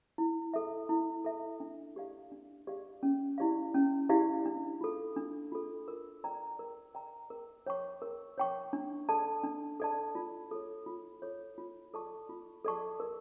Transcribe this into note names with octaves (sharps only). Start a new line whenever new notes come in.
E4
A4 E5
E4
A4 E5
D4
G4 D5 F5
D4
G4 D5 F5
C#4
E4 G4 D5 F5
C#4
E4 G4 D5 F5
D4
F4 A4
D4
F4 A4
A#4
D5 G5 A#5
A#4
D5 G5 A#5
A#4
C#5 G5 C#6
A#4
C#5 G5 C#6
D4
A4 D5 A5
D4
A4 D5 A5
F4
A4 C#5
F4
A4 C#5
F4
A4 D5 A5 C#6
F4
A4 D5 A5 C#6
A#4